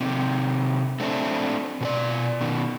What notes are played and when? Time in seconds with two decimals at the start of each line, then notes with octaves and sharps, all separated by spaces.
0.01 C3 D#3
1.00 A3 C4 D4
1.81 B2 A4 D5
2.41 B2 D#3